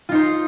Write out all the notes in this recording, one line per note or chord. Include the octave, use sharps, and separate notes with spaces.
D#4 F4 C5